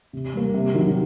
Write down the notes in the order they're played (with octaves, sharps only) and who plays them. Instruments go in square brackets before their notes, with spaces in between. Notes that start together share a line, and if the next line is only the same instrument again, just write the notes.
[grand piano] C3
G3 A#3
C3
D#3 F#3